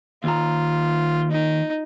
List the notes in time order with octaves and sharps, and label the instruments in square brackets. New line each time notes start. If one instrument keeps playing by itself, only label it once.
[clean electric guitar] D#2 A#5 [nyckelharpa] F4
[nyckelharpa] D#4